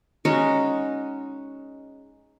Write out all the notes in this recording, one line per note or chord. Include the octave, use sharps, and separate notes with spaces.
G#3 C#4 D#4 F#4